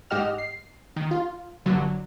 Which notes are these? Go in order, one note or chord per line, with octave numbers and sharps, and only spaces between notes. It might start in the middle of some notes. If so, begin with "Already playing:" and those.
G#2 G4 D#5 F#5 F6 E7
C7
D#3
F4
G1 D3 F#3